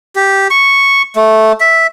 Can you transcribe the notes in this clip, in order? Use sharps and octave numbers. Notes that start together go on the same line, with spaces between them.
G4
C#6
A3
E5